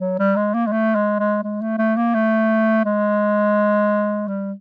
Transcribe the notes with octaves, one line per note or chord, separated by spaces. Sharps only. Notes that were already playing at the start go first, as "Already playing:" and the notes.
F#3
G3
G#3
A#3
G#3
A3
G#3
G#3
G#3
A3
A3
A#3
A3
G#3
G3